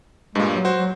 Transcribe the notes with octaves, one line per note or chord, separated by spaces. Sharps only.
G2 A#2 G#3
F#3
F#4 C5
F#3